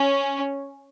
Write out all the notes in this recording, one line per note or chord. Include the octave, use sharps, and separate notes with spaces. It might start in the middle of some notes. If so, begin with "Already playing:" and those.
Already playing: C#4